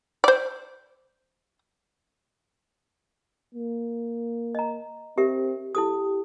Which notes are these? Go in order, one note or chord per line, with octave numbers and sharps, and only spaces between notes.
C5 D5
A#3
D#5 A#5
C4 G4 A#4 E5
E4 G4 A4 D#6